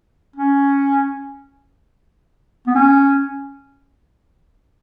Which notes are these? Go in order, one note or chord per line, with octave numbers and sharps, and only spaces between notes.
C#4
B3
C#4